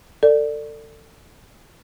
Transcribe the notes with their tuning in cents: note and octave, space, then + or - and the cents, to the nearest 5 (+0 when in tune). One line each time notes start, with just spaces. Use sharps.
A4 +30 D5 +10